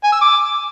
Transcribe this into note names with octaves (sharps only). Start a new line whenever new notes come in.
G#5
E6
D6